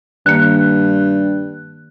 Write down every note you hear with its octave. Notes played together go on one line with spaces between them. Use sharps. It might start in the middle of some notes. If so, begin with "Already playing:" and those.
G2 D#3 A#3 F#6